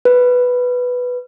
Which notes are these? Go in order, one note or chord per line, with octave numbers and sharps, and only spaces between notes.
B4